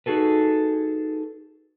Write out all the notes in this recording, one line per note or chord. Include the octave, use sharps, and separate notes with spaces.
D#4 F#4 G#4 A4 B4